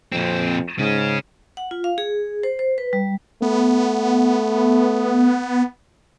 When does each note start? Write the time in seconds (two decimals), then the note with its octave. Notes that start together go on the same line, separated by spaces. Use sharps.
0.12 F2 A#2 C4
0.79 G#2 C#3 C#4
1.57 F#5
1.71 F4
1.84 F5
1.98 G#4
2.43 C5
2.59 C5
2.78 B4
2.93 G3
3.42 A3 B3